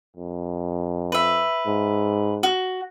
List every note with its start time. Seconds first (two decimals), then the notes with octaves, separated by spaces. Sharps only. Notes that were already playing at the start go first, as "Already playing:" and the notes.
0.17 F2
1.12 B4 E5
1.66 G#2
2.43 F#4